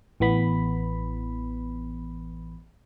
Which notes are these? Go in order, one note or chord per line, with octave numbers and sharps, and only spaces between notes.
A1 E3 B3 B5